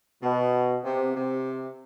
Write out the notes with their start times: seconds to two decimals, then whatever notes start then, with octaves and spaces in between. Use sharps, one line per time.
0.22 B2
0.84 C3
1.15 C3